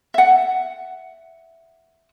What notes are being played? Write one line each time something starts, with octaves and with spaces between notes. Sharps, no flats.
E5 F#5